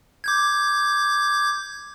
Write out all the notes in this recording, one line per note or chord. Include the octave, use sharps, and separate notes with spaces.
D6 G6 G#6